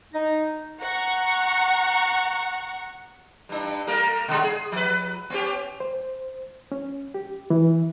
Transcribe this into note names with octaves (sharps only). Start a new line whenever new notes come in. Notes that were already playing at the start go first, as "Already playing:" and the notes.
D#4
F#5 A#5 C#6
G2 D4
G3 A3 A#4
A#2 D3 G#3
G#4
F3 B4
B3 C#4 G4
C5
C#4
G4
E3